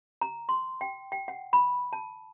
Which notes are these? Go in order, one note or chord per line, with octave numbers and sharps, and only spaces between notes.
A#5
C6
G5
G5
F#5
B5
A5